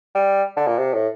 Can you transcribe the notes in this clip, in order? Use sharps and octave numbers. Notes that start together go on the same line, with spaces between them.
G3
D3
A#2
C3
A2